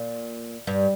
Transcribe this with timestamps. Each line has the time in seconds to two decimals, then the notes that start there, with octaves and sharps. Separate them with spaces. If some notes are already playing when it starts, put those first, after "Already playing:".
Already playing: A#2
0.67 G2